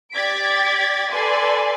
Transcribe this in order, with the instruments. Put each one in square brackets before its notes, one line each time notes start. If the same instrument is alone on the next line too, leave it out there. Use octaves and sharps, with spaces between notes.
[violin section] G4 D5 G#6 A6 B6 D7
A4 B4 D5 G#5 C6